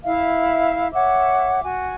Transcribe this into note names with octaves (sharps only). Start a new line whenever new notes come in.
E4 E5 F5
C#5 E5 F#5 D6
F#4 G#5